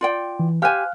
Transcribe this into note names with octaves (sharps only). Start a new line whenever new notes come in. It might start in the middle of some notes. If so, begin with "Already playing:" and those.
F4 D5 G5
E3
G4 C5 F5 G#5 F6 F#6